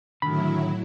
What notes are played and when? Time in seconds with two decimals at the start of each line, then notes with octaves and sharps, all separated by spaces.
0.22 A2 D3 D#3 F#3 E4 B5